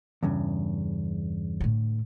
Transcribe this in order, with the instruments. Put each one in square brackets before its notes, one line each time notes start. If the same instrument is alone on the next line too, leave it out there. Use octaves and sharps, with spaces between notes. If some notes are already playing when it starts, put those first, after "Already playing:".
[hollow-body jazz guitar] E2 G2 C#3
[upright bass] A2 D3